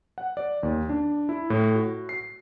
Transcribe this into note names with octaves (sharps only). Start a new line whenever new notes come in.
F#5
D5
D#2
D4
E4
A2
F#4
C7